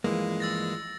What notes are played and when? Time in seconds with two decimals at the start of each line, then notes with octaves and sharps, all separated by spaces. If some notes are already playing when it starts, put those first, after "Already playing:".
0.04 G2 E3 F3 G#3 A#3
0.40 E6 A6 A#6